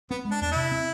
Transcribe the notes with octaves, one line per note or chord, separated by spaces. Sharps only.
B3 C4
G#3
D4
E2 D4
C3 E4
C4